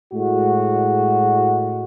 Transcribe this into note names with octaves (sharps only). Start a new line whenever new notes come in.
A2 G#3 F#4